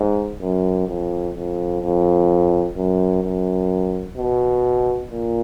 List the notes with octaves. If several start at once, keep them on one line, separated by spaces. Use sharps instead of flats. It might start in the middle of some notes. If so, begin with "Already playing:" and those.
Already playing: G#2
F#2
F2
F2
F2
F#2
F#2
B2
A#2